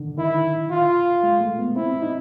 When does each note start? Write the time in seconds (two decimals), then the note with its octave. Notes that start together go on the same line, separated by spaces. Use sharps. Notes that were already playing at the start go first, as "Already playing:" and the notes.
Already playing: D3 D#3
0.18 D#3 E4
0.71 F4
1.23 G#3
1.41 A3
1.59 B3
1.76 C4 E4
2.02 D#4